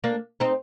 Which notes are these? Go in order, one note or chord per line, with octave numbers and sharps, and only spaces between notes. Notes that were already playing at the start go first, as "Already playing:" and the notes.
A#3 D4
C4 D#4